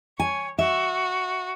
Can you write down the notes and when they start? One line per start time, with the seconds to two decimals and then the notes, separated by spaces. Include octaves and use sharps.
0.20 C#5 G#5
0.59 F#4 E5